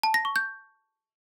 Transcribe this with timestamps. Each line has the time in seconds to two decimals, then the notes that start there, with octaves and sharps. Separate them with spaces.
0.03 A5
0.14 A#6
0.25 C#6
0.36 G6